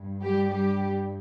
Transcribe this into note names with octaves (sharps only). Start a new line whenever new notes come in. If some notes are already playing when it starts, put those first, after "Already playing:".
Already playing: G2
G3 G4
G3 G4